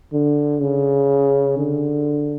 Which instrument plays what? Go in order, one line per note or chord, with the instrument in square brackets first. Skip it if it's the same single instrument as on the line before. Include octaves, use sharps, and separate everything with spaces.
[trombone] D3
C#3
D3